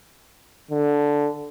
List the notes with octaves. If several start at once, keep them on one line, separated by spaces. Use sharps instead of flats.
D3